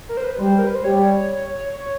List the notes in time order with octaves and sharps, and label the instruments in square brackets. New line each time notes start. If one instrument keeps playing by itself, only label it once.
[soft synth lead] A#4
C5
B4
[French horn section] G3 [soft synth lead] C5
[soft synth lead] A#4
B4
C5
[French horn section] G3 [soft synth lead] C#5
[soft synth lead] C#5